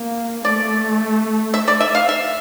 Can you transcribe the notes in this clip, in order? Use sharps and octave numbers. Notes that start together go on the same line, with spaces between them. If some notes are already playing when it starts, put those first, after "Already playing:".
Already playing: A#3
A3 D5
E5
D5
E5
F5
E5